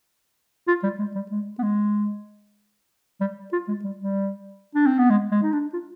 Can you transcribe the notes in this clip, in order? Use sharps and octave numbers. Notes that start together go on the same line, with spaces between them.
F4
G3
G#3
G3
G#3
B3
G#3
G3
F4
G#3
G3
G3
D4
C4
B3
G#3
G#3
D#4
D4
F4